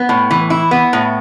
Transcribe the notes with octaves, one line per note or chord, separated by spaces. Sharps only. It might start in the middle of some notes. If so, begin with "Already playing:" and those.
Already playing: B3
A2
E3
E4
B3
A2